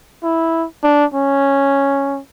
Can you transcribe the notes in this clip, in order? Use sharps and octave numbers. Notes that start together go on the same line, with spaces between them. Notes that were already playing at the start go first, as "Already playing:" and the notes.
E4
D4
C#4